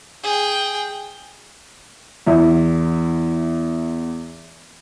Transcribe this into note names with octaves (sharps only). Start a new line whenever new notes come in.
G#4 G5
E2 E4